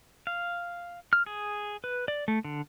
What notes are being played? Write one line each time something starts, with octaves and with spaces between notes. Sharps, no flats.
F5
F6
G#4
B4
D5
A3
D3